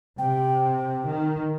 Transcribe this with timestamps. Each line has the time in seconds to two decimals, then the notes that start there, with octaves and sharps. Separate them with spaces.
0.18 C3 G5
1.07 D#3